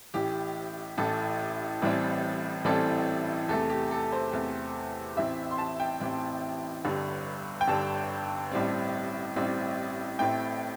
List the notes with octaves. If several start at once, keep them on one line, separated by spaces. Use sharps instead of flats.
A1 A2 E3 G4
A1 A2 E3 A4
A1 A2 E3 G3 C4
A1 A2 E3 G3 C4 A4
E2 C3 A3 A4
G4
A4
C5
E2 C3 A3
A1 A2 E3 C4 E5
C6
A5
G5
A1 A2 E3 C4
G1 G2 D3
G5
G1 G2 D3 A5
A1 A2 G3 C4
A1 A2 G3 C4
A1 A2 A3 C4 G5